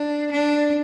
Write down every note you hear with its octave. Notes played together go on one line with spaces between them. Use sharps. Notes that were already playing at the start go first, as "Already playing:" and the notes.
Already playing: D4
D4